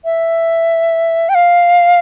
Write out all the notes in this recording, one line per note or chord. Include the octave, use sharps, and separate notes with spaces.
E5
G5
F5